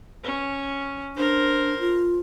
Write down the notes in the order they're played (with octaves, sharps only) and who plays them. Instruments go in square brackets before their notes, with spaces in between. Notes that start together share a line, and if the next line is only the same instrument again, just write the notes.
[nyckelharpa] C#4
[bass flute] D4 [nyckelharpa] A#4 C5
[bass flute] F4